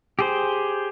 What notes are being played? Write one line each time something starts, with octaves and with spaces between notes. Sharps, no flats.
G4 G#4 C5